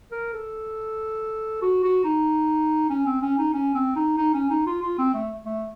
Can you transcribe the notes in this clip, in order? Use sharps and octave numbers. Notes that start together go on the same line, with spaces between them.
A#4
A4
F#4
F#4
D#4
C#4
C4
C#4
D#4
C#4
C4
D#4
D#4
C#4
D#4
F4
F4
C4
A3
A3